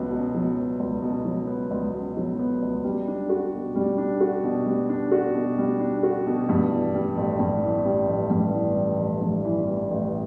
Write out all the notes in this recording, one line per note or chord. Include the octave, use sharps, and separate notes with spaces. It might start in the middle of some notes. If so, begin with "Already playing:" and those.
Already playing: C#2 F#3 B3
B2
F#3
B3
C#2
B2
F#3
B3
C#2
B2
F#3
B3
C#2
G3
D4
F#4
B2
G3
D4
F#4
B2
G3
D4
F#4
B2
G3
D4
F#4
B2
G2
E3
G3
A1
G2
E3
G3
A1
G2
E3
G3
A1
G2
E3
G3
A1